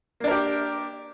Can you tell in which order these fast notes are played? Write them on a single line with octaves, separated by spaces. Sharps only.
A#3 D4 A#4 G4